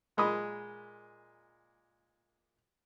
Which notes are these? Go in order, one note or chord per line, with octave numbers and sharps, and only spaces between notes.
A#2 G#3 B5 D#6